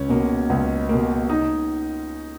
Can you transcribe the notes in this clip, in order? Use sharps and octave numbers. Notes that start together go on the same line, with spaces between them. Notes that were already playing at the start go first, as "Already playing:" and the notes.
Already playing: C#2 C#4
B2 A#3
C#2
B2 A#3
D#4